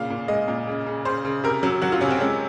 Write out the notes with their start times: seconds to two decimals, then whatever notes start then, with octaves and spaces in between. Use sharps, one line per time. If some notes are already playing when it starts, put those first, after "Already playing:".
Already playing: A#2 C#3 F5
0.10 A#2
0.28 G#3 D#5
0.48 A#2
0.67 C#3
0.86 C#3
1.05 C#3 C5
1.25 C#3
1.44 C3 A#4
1.63 F#3
1.82 F#3 F#4
1.92 F4
2.01 C3 C#4
2.11 C4
2.20 G#3 C#4